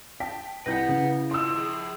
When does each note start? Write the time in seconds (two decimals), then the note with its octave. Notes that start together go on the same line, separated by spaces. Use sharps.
0.20 G5 A5 B6
0.66 C2 E4 B4 F#5 G6 A#6
0.89 C#3
1.31 D#3 F4 C6 E6
1.55 F3 G#4